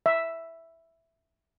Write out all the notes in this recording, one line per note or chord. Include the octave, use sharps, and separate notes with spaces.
E5